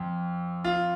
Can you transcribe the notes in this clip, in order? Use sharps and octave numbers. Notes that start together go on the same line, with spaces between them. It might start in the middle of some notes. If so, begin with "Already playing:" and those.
Already playing: F2
F4